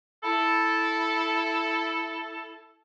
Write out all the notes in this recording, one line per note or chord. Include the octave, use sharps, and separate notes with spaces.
E4 A4